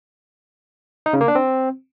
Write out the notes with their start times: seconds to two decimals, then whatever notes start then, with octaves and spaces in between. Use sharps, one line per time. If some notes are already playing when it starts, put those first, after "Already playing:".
1.06 D#4
1.13 C#3
1.21 A#3
1.28 D4
1.35 C4